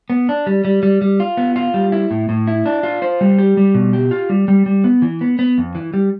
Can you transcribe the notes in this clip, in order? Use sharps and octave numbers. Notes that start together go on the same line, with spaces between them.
B3
D4
G3
G3
G3
G3
F4
B3
F4
G3
E4
A2
A2
E4
D4
F4
C5
G3
G4
G3
B2
G4
F4
G3
G3
G3
B3
E3
B3
B3
F2
E3
G3